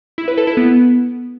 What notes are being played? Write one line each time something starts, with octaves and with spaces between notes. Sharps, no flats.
E4
B4
A4
E4
B3